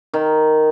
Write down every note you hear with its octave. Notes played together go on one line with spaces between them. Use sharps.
D#3